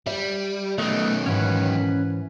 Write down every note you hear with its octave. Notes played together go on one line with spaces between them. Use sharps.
G3 E5
F#2 D#3 A3 B3 D#5
G#2 E3 C#4 B4